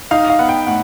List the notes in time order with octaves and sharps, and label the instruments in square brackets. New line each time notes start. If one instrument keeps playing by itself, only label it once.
[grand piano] D#4 [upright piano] F5
[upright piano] F5
[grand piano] B3 [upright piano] F#5
[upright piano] G5
[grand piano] A2 [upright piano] F#5